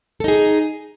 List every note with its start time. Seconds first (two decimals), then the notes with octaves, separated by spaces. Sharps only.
0.20 A4
0.24 D#4
0.28 G#4